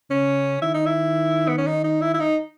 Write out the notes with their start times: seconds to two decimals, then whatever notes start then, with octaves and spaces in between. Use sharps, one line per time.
0.10 C#3 C#4
0.62 D#3 E4
0.74 D#4
0.86 E4
1.48 B3
1.58 C#4
1.67 D#4
1.84 D#4
2.02 E4
2.14 E4
2.20 D#4